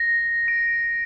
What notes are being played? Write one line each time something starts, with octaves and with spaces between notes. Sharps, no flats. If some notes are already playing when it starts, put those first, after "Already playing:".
Already playing: A#6
D7